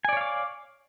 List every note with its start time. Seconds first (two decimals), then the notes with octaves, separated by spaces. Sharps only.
0.05 G#5
0.09 D5
0.13 C#5
0.17 F5
0.21 D6